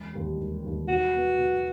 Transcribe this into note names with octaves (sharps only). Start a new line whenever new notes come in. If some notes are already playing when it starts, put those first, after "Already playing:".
Already playing: E1
D#2 D#3 G3
E1
D#2 D#3 G3
B2 F#4
F#3 B3
B2